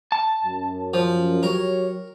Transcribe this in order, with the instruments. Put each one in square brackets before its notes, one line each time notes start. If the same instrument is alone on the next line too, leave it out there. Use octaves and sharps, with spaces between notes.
[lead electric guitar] A5
[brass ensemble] F#2
[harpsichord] F3
[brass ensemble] F#3 G4 C#5 [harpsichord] A#4